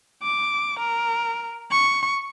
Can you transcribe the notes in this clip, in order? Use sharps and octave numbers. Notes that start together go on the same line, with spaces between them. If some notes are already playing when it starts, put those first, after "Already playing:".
D6
A#4
C#6